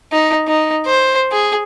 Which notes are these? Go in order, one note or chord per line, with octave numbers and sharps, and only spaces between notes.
D#4
D#4
C5
G#4